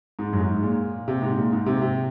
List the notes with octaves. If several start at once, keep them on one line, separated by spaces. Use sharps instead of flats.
G#2
F#2
G#2
A#2
C3
G#2
A#2
G#2
C3
C3